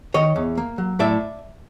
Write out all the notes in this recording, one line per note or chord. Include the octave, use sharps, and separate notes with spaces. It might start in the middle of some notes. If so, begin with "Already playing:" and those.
D#3 C#5 D#5
E2
A#3
F#3
A2 D5 E5